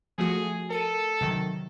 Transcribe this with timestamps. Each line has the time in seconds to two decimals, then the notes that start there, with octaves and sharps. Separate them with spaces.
0.18 F3 A3 F#4 G#4
0.70 A4 A#4 C#7 D#7
1.21 C3 D#3 F#3